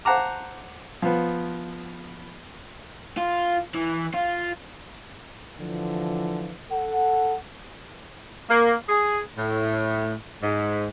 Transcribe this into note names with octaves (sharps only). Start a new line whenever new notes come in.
C5 F#5 A5 A#5 D6
F3 B3
F4
E3
F4
D3 E3 F3
A4 F#5
A#3
G#4
A2
G#2